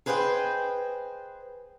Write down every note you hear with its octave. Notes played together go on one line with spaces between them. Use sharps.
G#4 B4 C5 D#5 E5 G5